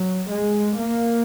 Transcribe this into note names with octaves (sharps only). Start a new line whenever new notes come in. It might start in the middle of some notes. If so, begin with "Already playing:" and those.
Already playing: F#3
G#3
A#3